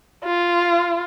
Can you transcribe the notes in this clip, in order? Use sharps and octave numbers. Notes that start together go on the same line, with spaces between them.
F4